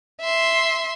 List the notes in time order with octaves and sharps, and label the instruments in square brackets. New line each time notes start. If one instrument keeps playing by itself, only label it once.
[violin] E5 C6